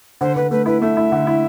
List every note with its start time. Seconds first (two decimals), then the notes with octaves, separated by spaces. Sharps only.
0.21 D3 C5
0.36 D3 B4
0.51 A3 B4
0.66 E4 B4
0.81 A3 E5
0.97 E4
1.12 D3
1.27 E4